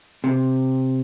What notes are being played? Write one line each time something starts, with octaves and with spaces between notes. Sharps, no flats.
C3